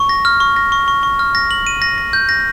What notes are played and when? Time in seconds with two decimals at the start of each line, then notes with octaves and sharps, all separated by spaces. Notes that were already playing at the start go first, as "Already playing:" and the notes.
Already playing: C#6
0.09 A#6
0.25 F6
0.40 C#6
0.56 A#6
0.72 C#6
0.88 C#6
1.03 C#6
1.19 F6
1.35 A#6
1.51 F#7
1.67 D#7
1.82 A#6
1.98 A#6
2.13 G6
2.29 A#6